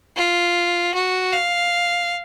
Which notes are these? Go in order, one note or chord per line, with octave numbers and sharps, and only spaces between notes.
F4
F#4
F5